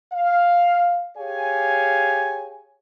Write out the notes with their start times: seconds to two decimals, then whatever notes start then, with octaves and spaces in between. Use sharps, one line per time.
0.13 F5
1.17 G4 G#4 C#5 F5 G#5